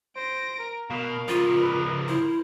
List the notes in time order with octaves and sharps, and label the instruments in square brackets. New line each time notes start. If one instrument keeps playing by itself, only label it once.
[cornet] C5 [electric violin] A#6 D7
[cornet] A#4
[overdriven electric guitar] B2 [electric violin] A#4 [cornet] F5
[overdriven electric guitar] C#3 F3 [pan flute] F4
[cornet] B4
[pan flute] E4 [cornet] C5